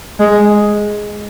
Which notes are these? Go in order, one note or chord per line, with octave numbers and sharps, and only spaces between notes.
G#3